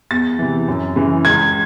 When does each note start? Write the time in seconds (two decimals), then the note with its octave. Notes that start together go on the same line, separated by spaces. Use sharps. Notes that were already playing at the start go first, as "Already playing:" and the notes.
0.11 E2 A6
0.39 C3 E3
0.68 F#2
0.96 C#3 E3
1.25 C#2 G#6